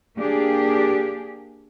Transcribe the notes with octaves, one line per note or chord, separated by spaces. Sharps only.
A#3 D4 G4 G#4